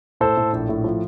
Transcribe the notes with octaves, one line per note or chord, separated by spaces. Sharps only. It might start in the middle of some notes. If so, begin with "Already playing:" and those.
A2 A4 C5
A2
A#1
A2
F3